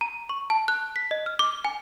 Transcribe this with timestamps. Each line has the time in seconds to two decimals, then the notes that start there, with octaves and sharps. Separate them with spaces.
0.01 A#5
0.29 C#6
0.50 A5
0.68 F#6
0.96 B6
1.11 D#5
1.26 F6
1.39 D6
1.65 G#5